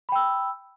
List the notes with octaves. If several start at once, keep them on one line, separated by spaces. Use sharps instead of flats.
G5 B5 E6